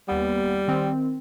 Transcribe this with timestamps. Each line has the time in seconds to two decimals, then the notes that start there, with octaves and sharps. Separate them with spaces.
0.08 D#2 G3 B3
0.68 D#3 C4